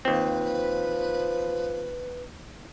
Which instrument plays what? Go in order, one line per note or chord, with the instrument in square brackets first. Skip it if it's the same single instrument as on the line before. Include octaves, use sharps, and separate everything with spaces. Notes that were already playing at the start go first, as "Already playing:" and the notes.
[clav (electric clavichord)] D#2 C4 [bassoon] F3 [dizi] B4